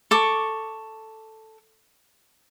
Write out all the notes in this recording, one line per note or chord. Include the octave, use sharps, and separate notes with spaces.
A4 C#6 D6